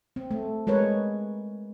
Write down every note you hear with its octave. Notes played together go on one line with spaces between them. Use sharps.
C4
A3
G#3 A#4 B4 C#5